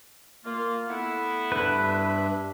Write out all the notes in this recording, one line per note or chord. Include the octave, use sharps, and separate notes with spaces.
A#3 F4
A3 B3 E4 F#5
G2 D4 B4 E5